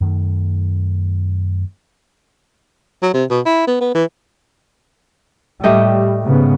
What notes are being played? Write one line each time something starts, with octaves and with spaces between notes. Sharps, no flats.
F#2 D#3 A3
F#3
C3
B2
E4
B3
B3
E3
A2 G3 A3 G4 D#5
G#2 C#3 B3